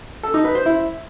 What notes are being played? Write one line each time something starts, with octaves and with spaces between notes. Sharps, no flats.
A4
D#4
B4
C5
E4